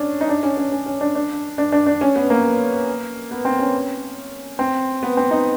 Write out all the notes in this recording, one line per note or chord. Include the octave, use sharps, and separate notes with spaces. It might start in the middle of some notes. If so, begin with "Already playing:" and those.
Already playing: C#4 D4
D#4
D4
C#4
C#4
C#4
C#4
D4
D4
D4
D4
D4
C#4
B3
A#3
B3
C4
C#4
C4
B3
C4
D#4